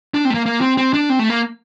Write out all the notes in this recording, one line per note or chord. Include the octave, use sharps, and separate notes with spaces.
D4
C4
A3
A#3
A#3
C4
C4
D4
C4
A3
A#3